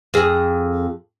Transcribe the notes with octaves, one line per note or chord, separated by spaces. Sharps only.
F2 G#4